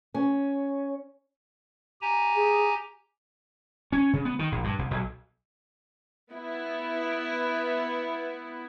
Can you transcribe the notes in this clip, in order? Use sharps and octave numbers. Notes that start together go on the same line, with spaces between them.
C#4
G4 G#5 A#5
G#4
C#4
C#3
B3
D#3
A#1
G2
C2
B1
B3 E4